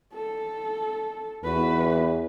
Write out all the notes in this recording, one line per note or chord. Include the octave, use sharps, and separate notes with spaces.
A4
E2 F#4 B4